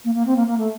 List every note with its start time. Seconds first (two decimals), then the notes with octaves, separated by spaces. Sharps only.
0.04 A#3
0.14 A#3
0.26 C4
0.36 A#3
0.47 A#3
0.58 A3